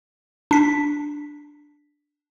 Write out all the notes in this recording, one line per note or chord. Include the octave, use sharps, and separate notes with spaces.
D4 B6